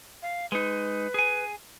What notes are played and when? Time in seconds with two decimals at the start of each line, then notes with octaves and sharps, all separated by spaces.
0.22 F5
0.52 G#3 D#4 B4
1.14 G#4 G#5